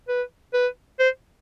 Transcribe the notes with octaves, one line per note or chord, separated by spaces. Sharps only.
B4
B4
C5